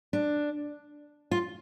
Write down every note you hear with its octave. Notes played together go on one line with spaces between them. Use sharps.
D4
F4